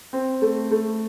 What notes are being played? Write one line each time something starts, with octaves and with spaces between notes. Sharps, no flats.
C4
A3
A3